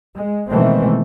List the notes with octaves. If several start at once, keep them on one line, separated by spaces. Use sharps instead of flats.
G#3
B2 D#3 E3 G#3 A3 C4